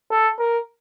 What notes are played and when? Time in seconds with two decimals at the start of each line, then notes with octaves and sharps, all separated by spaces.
0.11 A4
0.39 A#4